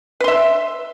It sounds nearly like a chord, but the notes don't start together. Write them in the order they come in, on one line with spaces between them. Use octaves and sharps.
B4 C6 E5